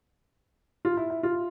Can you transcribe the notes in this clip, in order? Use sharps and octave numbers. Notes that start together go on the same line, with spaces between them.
F4
E4
E4
F4